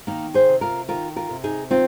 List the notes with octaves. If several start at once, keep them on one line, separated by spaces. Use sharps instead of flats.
D#3 A#3 D#4
G#4 C5
C3
F4 A#4
D#3 F4 A#4
F4 A#4
C3
D#4 G#4
D#3 C4 F4